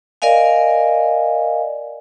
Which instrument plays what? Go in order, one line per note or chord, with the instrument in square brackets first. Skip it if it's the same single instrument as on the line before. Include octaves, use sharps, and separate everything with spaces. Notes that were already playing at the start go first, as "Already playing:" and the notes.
[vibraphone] A#4 D5 D#5 F5 G#5